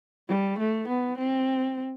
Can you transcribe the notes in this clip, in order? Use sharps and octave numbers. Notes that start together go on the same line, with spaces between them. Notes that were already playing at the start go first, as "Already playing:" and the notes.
G3
A3
B3
C4